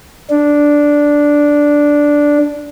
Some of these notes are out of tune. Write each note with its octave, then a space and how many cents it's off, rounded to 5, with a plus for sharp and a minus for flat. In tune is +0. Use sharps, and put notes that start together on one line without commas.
D4 -5